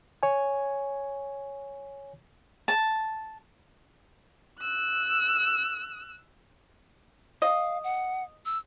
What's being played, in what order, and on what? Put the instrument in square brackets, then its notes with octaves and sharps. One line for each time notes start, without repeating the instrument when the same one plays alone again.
[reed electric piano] C#5 G#5
[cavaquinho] A5
[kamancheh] E6 F#6
[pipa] D#5 [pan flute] F5
[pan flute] F#5
E6